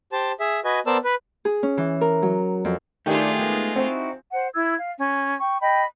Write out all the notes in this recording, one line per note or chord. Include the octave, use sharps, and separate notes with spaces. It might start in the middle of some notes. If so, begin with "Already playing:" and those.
G4 C5 A5
G#4 E5
F#4 B4 D#5 G#5
B3 A#4 C5 D5 A5 E6
B4
G#4
C#4
E3
A#4
F#3
F2
D#3 A3 D4 F4 G4 G#4
G#3 B3 D#4
C4 D#4 E4 F#4
C5 F#5
E4 E6 G#6
F5
C#4
G5 C#6
D#5 G5 B5